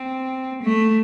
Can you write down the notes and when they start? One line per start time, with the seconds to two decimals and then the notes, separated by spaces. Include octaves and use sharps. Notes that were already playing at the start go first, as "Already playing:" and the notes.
Already playing: C4
0.63 A3